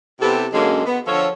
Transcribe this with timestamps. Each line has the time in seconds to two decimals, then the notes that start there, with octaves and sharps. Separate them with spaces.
0.21 C3 B3 C4 E4 G4 A4
0.53 F#2 D3 F#3 G#3 A#3 C#4
0.85 B3
1.07 D3 F3 A4 C#5